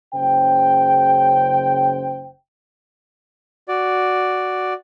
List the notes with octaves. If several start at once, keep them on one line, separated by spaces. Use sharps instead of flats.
F#1 C#3 C5 G5
F#4 D5